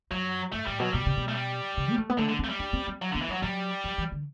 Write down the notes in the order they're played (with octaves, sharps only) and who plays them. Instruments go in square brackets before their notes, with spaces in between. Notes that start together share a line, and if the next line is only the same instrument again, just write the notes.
[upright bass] F#2 [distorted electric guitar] F#3
[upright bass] G2 [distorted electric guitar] A3
[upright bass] A2 [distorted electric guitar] G3
[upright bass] B2 [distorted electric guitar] F#3
[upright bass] B2 [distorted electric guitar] G3
[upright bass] C3
B2
[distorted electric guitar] A3
G3
[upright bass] C3
B3
A3
B3
[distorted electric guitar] D3 [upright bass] A3
[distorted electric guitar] D3
[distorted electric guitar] A3 [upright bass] C4
[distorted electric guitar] G3
[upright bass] D4
C4
C4
[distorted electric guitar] F#3
D3
[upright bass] B3
[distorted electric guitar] E3
[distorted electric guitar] F#3 [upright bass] G3
[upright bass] F#3 [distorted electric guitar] G3
[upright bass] F#3
E3
D3